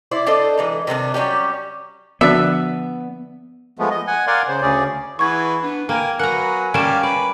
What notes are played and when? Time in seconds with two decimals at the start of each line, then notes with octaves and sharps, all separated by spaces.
0.11 E4 C5 D5
0.27 D4 A4 C5 D#5
0.57 E3 G#3 D#4
0.87 C3 D#3 G3 D4
1.14 F#3 G3 C#4 G4
2.21 D3 F3 B3 D4 F#4 E5
3.78 F3 G#3 A3 B3
3.91 D#5
4.07 F#5 G#5
4.27 A#4 D5 F5 F#5 G#5 C6
4.48 C#3 C5
4.62 D2 C#3 C#4 G#4 D5
5.19 E3 G#4 B4 F#5 C#6 G#6
5.62 B3 D4
5.89 A#3 A#4 G5 G#5
6.19 F#3 B3 A#4 F#5 G#5 A#5
6.74 G3 A#3 C#4 G4 D5 F5 D7 E7
7.03 B4 D5